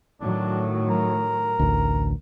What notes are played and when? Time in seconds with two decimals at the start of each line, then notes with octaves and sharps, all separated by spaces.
0.21 A2 D#3 F#3 D4
0.90 A#4
1.59 A1 D2